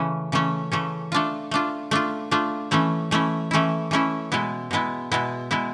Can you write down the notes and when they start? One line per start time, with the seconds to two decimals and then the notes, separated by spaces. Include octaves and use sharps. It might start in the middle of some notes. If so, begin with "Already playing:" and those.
Already playing: C#3 E3 A3 C#4
0.32 C#3 E3 A3 C#4
0.72 C#3 E3 A3 C#4
1.12 A3 D4 F4
1.51 A3 D4 F4
1.91 A3 D4 F4
2.31 A3 D4 F4
2.71 E3 A3 C#4 E4
3.11 E3 A3 C#4 E4
3.51 E3 A3 C#4 E4
3.91 E3 A3 C#4 E4
4.32 B2 G#3 B3 E4
4.71 B2 G#3 B3 E4
5.12 B2 G#3 B3 E4
5.51 B2 G#3 B3 E4